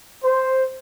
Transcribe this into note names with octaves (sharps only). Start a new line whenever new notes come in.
C5